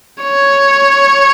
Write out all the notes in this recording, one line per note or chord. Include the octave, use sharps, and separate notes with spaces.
C#5